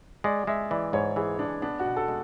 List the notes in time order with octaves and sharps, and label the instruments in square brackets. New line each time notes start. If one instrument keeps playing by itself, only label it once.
[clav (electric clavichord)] G#3 [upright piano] D5
[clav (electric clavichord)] G#3 [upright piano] E5
[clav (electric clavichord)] E3 [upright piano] D5
[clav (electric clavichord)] G#2 [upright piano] C#5
[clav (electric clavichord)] E3 [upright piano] G#4
[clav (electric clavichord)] G#3 [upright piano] D4
[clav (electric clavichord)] B3 [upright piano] D4
[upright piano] F#4
[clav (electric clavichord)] B2
[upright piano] A4
[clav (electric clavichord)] G#3